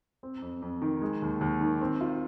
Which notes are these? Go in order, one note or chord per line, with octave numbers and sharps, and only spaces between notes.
C4
F2
F2
D#3
G#3
D#2
D#2
D#3
C4
F4